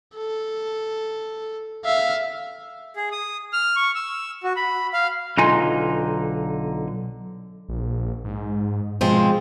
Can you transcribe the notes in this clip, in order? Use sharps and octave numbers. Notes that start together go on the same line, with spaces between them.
A4
E5 F5
G#4
D#6
F6
C#6
E6
F#4
B5
F5
B1 D3 D#4 F4 G#5
A#1
G#2
B2 F3 G#3 C4